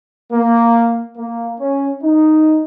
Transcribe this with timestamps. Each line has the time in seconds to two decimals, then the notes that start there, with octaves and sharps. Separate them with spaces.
0.32 A#3
1.17 A#3
1.60 C#4
2.02 D#4